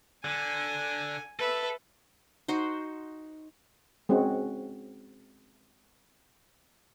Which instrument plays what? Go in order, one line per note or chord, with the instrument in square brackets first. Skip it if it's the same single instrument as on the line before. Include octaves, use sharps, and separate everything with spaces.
[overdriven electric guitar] D3 [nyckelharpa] G#5
[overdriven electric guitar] A4 [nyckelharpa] B4 E5
[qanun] D#4 F#4 C5
[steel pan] G#3 C4 C#4 F#4